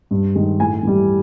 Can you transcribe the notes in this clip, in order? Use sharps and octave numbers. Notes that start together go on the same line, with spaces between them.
G2
D#3 G#3
A2 G#5
E3 G3